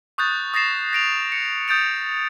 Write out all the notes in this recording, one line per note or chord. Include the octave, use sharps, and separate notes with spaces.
C#6 D#6 F#6 G6 A6
D#6 A6 A#6 C7 E7
A#6 D7 F7
C#7
D#6 G6 A6 D7 F7